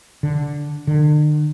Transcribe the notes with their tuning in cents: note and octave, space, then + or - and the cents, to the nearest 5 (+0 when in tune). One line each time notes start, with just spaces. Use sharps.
D3 -5
D3 +45